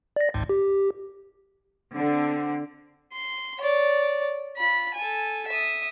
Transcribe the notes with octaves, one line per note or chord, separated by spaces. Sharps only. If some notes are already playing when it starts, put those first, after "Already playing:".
D5 A#6
G#1 C#2 G#2
G4
D3 C4
C6
C#5 D5
F4 B5
A4 G#5
E5 D#6